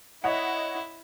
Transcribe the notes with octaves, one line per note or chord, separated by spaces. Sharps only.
E4 C#5 D#5 F#5